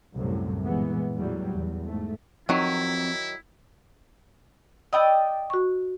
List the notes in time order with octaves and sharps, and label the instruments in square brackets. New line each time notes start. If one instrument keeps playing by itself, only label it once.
[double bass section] C2 F#2 A2 C3
A#2 E3 G#3 B3
E2 A2 F#3 G3
E2
G#2 A3
[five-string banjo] D#3 F#3 [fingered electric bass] F3 C4 [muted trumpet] E4
[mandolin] D5 G5 D#6 [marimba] D#5 B5 E6
[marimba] F#4 C#6